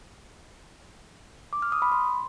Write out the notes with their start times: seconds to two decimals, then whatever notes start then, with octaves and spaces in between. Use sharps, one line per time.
1.53 D6
1.62 F6
1.72 D#6
1.82 B5
1.92 C6